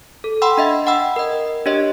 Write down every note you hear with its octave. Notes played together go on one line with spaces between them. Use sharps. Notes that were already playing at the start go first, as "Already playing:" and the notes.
A4
F#5 G5 B5 C6 E6
D4 D#5 E5
F#5 G5 B5 E6
A#4 D#5
D4 G4 C#5 D#5